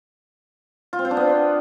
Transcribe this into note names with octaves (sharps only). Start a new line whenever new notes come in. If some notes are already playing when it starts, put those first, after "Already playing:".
F4
C4
C5
D4
B3